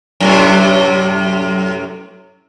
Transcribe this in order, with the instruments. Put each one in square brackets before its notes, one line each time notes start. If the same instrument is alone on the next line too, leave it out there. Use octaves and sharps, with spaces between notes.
[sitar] F#2 A2 C3